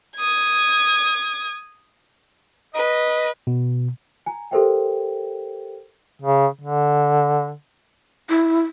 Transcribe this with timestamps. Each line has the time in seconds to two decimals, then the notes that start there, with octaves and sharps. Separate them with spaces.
0.17 D#6 G#6
2.74 B4 D#5
3.47 B2
4.26 G#5 A#5
4.51 G4 A4 A#4 C5 E5 G5
6.22 C#3
6.61 D3
8.29 E4